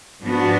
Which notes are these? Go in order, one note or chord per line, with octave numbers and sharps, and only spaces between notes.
G#2 F3 B3 D4 F#4